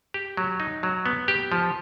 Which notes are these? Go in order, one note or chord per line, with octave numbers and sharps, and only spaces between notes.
G4
F#3
D#4
F#3
B3
G4
F3